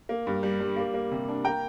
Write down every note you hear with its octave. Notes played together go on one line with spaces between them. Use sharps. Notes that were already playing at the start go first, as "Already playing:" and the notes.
A#3
G2
G3
G3
A#3
A#3
C3
D4
A#3 G5 A#5